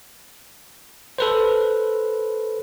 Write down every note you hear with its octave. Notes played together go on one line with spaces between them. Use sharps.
A4 B4 C5